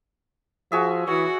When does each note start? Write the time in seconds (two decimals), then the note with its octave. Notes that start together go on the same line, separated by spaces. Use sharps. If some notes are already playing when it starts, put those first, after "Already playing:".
0.72 F3 F#4 G#4 E5
1.08 E3 F#4 C#5